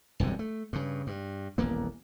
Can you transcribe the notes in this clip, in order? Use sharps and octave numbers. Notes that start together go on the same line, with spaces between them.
E1 C2 F#2 D3
A3
G2 C#3
G2
D#1 A1 A#3 B3